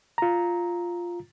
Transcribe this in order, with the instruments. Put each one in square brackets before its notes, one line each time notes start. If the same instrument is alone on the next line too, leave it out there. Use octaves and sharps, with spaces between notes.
[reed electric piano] F4 A#5